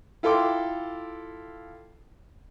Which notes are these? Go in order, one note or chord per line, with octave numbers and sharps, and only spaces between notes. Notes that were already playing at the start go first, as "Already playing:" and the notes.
E4 F4 A4 G5 C6 D6